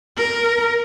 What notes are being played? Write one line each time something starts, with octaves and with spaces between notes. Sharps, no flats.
A#4